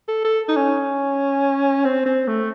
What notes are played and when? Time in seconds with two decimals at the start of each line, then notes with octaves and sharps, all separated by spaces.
0.08 A4
0.25 A4
0.48 D#4
0.56 C#4
1.85 C4
2.06 C4
2.27 A3